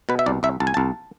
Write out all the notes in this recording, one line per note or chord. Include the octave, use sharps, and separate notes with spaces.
B2 B4
E5
C2 D5
C2 E5
C2 A5
G#5
C2 A5